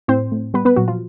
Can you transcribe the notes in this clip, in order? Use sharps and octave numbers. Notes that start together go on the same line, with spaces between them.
A2 C4 C5
A2
G3 B3 B4
B3 B4
A#2 F#3 F#4
F3 F4